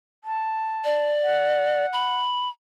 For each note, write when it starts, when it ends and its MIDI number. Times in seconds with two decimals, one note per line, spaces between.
0.24 1.07 81
0.85 1.86 74
1.23 2.17 78
1.93 2.49 83